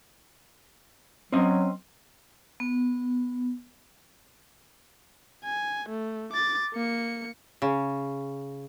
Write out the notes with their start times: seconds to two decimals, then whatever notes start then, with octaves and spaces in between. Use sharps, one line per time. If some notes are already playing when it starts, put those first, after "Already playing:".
1.32 F#3 C4 C#4 D#5
2.60 B3
5.45 G#5
5.89 A3
6.33 D6 A6
6.74 A#3 C#7
7.62 C#3